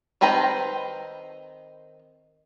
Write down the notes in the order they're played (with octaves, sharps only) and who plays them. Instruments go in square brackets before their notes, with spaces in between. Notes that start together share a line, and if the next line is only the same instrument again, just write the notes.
[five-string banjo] D#3 C4 B4 G5 A#5